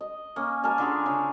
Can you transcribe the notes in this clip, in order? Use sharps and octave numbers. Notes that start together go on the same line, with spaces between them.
D#5
A#3 C#4
A#4 F5 G#5 A5
D3 F4 G#4
C#3